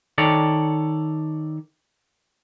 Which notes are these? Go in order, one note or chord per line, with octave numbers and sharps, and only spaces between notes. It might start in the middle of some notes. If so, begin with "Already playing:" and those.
D#3 A4 C#5 D5